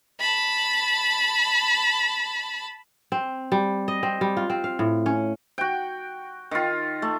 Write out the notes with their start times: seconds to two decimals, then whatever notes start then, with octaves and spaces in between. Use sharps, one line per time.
0.20 A5 B5
3.12 C4
3.52 G3
3.88 D#5
4.03 C4
4.21 G3
4.37 F4
4.50 C4
4.64 F5
4.79 A2
5.06 C#4
5.58 F#4 G5
6.51 D#3 F4
7.02 A3